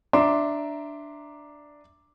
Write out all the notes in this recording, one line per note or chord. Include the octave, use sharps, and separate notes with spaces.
D4 E5 A#5 C6 D6